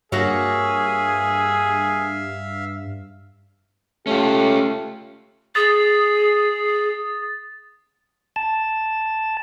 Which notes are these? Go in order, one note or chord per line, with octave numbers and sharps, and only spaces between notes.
G2 A#3 F#4 G#4 C#5 E5 F5
A3 C#4 F4 G4
G#4 D#6 A6
A5